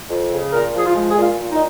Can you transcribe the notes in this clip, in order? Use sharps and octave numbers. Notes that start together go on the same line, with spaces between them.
F2
C#3
A#2 A#4
F3 G#4
F4
G#3
G#4
A#2 F4
A#2
D#4